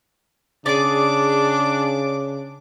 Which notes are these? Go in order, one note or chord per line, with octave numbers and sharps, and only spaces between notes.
C#3 D4 G#4 D5 D6